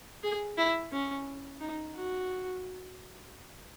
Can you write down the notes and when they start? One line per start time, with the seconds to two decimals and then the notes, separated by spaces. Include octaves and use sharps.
0.23 G#4
0.58 E4
0.92 C#4
1.60 D#4
1.96 F#4